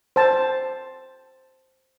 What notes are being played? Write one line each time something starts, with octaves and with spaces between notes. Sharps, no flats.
C5 A5